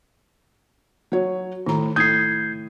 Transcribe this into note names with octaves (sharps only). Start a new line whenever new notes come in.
F#3 C#5
A2 D#3 A#5
A2 D#6 G6 G#6 C7